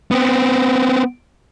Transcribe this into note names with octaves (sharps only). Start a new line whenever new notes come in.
B3 C4